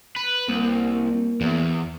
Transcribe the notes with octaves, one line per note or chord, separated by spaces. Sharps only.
B4
C2 A#3
E2